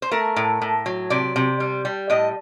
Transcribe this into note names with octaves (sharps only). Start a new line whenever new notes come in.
C5
A3 A#4
A2
A2
F#3
C3 D5
C3
G3
G3
A2 D#5